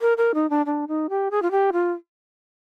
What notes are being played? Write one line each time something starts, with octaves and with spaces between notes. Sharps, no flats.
A#4
A#4
D#4
D4
D4
D#4
G4
G#4
F4
G4
F4